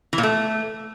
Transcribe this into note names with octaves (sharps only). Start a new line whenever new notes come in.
E3
A#2
A3